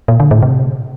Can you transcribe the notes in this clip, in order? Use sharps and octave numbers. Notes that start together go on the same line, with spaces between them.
A#2
D3
A2
C3